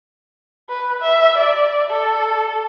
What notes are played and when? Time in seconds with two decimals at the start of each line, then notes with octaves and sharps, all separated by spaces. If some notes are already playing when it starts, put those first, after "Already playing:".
0.69 B4
1.01 E5
1.37 D5
1.90 A4